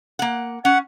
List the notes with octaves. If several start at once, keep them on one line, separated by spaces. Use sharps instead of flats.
A#3 F#5
C#4 F#5